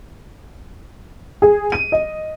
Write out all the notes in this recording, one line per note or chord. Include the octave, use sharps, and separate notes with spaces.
G#4
D#7
D#5